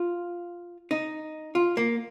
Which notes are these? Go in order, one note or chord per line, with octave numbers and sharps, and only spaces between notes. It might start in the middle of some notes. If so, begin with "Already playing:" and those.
Already playing: F4
D#4
F4
A#3